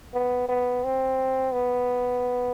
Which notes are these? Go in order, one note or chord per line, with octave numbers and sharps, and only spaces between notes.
B3
B3
C4
B3